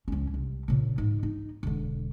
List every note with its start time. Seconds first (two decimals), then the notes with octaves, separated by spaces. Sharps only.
0.08 C#2 C#4
0.34 C2
0.68 A#2 C#3
0.98 G#2
1.23 D#4
1.63 E1 D3